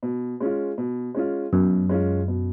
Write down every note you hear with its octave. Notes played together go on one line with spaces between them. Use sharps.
B2
G#3 C#4 F4
B2
G#3 C#4 F4
F#2 B2
G#3 C#4 F4
B2